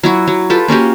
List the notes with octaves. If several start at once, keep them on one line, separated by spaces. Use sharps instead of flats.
F#3 E4 F#4
F#3
F4 G4 A4 B4
A#3 C#4 F#4 G4